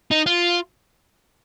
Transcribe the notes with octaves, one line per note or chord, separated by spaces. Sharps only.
D#4
F4